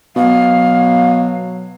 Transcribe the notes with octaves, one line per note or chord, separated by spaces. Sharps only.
B2 F#3 F5